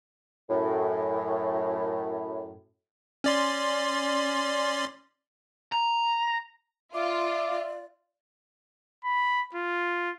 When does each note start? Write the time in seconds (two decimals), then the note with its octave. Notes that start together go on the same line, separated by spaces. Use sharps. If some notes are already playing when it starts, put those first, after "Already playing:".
0.50 F#2 A2
3.24 C#4 D5 C6
5.72 A#5
6.94 F4 D5 E5 D6
9.04 B5
9.54 F4